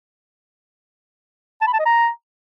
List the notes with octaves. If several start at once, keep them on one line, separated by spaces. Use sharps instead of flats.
A5
B5
A5
D#5
A#5